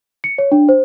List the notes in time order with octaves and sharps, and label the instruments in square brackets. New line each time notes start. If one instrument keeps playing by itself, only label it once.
[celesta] C#7
C#5
D4
C5